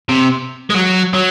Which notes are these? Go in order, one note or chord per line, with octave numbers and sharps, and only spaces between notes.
C3
G#3
F#3
F#3